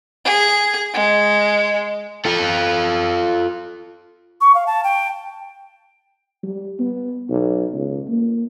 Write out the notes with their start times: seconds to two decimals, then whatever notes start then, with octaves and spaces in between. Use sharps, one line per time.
0.25 G#4
0.94 G#3
2.26 F4 A4
4.41 C#6
4.55 F5
4.67 A5
4.84 G5
6.43 G3
6.79 B3
7.30 B1
7.73 C#2
8.08 A#3